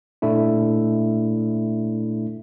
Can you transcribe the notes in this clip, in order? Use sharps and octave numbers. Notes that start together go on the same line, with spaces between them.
A#2 A3 D4 E4